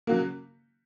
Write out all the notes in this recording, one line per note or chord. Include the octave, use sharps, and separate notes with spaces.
C#3 F#3 A#3